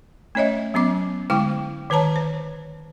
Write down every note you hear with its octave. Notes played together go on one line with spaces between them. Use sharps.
A3 C#4 C#5 D#5 E5
F#3 B3 C#4 D6
D3 G#3 E4 G5 D6
D#3 B4 C#5 A5 A#5
C5